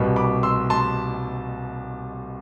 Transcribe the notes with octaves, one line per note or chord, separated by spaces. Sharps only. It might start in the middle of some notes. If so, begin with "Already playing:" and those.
Already playing: C2 B2 G3
B5 D6
C6 E6
A5 C6